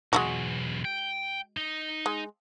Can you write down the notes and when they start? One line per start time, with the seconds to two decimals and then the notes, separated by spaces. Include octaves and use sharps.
0.13 B1 E2 G#3 F4 F#4
0.85 G5
1.57 D#4
2.06 G#3